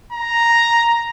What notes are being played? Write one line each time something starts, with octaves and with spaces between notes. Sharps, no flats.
A#5